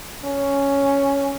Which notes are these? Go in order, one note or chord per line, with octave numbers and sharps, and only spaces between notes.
C#4